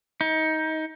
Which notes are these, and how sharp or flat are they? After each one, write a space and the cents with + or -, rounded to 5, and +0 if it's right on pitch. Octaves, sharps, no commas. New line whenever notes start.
D#4 +25